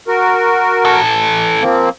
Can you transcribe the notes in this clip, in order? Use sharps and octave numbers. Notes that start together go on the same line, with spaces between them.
F#4 A#4
E3 A4
F3 A#3 C4